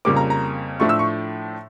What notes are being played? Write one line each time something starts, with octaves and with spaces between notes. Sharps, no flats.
F2 C#3 G3 A#3 D6
A#5
A#5
A2 F3 A3 D4 C#6
E6
C#6